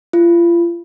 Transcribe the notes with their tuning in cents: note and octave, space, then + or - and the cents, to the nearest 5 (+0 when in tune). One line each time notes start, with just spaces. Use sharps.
F4 -35